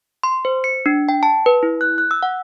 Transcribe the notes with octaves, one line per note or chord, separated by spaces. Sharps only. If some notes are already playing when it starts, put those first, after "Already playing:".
C6
C5
C#7
D4
G5
A5
B4
E4
F#6
F#6
E6
F#5